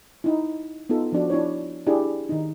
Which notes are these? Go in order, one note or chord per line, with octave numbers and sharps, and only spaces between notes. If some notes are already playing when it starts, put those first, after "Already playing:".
D#4 E4
B3 D#4 F4 A4
F3 D4 F#4
D4 E4 C#5
D4 E4 G4 G#4
D#3 D#4